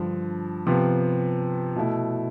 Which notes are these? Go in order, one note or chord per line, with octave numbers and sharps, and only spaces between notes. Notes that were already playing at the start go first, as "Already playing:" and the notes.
Already playing: G2 D3 F3
C3 F3 B3
B2 A3 E4